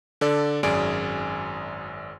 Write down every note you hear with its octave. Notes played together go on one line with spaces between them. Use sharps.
D3 A4 D5
G#1 F#2 G#4 D5 G#5 D7